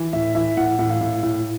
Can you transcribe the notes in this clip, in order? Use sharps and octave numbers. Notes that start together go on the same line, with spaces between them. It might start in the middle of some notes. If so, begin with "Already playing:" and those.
Already playing: E3
A2 E5
E3 E5
A2 F#5
A2
F5
A2
A2